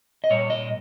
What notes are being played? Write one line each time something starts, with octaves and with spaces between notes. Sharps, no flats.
D#5
A#2 G3 C#5
D#5